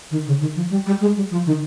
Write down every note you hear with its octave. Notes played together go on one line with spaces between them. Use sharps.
D#3
C#3
D#3
F3
G3
G3
G#3
G3
F3
D#3